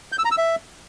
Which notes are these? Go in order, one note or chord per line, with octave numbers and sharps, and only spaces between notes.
G6
E6
A#5
E6
E5